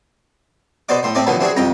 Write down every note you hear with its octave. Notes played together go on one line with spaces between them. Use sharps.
B2 C5 D5 D#5 D6
A2 C5
A3 C4 D5 D#5
B2 D3 D#3 F3 F#3
E3 C4 D4 F#4 G#4
C2 F2 D#5 G5 A#5